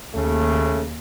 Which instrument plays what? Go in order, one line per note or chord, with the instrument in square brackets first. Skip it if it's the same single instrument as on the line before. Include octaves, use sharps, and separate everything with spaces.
[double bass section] D#2 [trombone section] C#3 A3